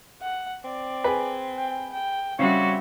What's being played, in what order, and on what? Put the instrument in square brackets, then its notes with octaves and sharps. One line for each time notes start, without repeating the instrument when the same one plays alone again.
[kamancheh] F#5
[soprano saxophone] C4 [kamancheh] D5
[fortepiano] G#4 B4
[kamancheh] G5
G5
[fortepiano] C#3 [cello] G3 F#4 [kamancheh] C4 E5 [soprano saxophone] C#5